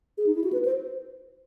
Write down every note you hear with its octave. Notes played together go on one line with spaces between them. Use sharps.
G#4
D#4
E4
F#4
B4
C5